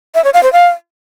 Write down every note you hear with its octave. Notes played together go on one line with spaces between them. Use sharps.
E5
C#5
F5
C5
F5